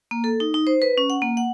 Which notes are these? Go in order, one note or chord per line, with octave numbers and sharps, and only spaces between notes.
A#3
A4
D#4
D#4
C5
B4
C#4
F#5
A#3
F#5